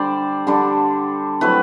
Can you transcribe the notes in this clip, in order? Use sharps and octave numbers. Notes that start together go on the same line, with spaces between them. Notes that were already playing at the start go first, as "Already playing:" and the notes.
Already playing: D3 G3 D4 C5 D5
D3 G3 D4
F#3 A3 C4 E4 B4